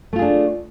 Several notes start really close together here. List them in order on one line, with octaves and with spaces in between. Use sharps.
A3 F4 G#4 D4